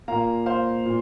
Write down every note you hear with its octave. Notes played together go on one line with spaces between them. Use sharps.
A#2 A#3 F5 A#5
C5 F5
A#2